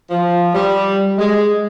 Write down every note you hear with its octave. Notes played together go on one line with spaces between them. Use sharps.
F3
G3
G#3